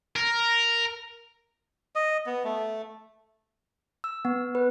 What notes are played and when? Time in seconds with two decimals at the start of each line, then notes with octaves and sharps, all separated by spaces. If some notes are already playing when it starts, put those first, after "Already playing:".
0.16 A#4
1.95 D#5
2.26 B3
2.44 A3
4.04 E6
4.25 B3
4.55 B4